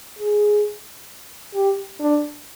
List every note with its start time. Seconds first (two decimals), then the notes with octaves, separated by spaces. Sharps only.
0.19 G#4
1.54 G4
2.00 D4